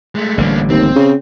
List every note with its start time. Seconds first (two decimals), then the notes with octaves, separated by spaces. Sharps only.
0.15 G#3 A3
0.38 A1 D3 G3 A#3 D4
0.70 D#2 C4
0.95 C#3